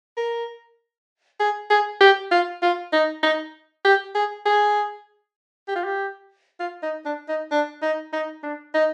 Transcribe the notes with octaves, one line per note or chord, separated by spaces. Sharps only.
A#4
G#4
G#4
G4
F4
F4
D#4
D#4
G4
G#4
G#4
G4
F4
G4
F4
D#4
D4
D#4
D4
D#4
D#4
D4
D#4